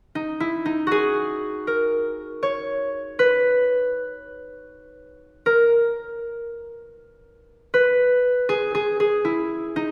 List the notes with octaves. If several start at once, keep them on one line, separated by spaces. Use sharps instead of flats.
D#4
E4
D#4
F#4 G#4
A#4
C#5
B4
A#4
B4
G#4
G#4
G#4
E4
D#4